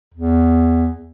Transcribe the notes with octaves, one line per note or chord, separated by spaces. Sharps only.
E2